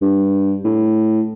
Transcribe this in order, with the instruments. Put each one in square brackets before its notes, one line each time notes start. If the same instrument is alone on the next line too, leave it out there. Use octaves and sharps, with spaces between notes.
[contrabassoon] G2
A2